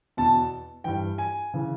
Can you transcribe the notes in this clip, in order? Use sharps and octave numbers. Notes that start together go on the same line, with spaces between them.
E2 B2 A5
G2 E3 G5
G#5
C#3 E3